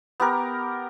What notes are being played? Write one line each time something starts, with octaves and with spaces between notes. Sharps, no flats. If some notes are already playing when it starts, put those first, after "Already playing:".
B3 G4 A#4